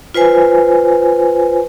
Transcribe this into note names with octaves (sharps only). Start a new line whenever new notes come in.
F4 B4 C5 G#5